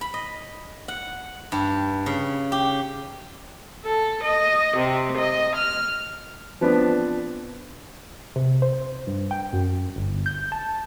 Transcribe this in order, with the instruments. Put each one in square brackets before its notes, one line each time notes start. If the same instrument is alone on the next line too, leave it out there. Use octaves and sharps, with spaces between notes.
[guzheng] B5
D#5
F#5
G2
C#3
G4
[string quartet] A4
D#5
C3
D#5
F6
[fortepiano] F3 B3 C4 D4 B4
[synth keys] C3
C5
G2
G5
F#2
G1
G6
A5